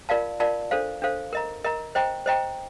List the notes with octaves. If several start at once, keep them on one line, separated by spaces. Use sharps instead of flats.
F4 A#4 D5 F5 A5
F4 A#4 D5 F5 A5
D4 A4 C5 F5
D4 A4 C5 F5
A#4 D#5 A#5
A#4 D#5 A#5
C5 D#5 G5 A#5
C5 D#5 G5 A#5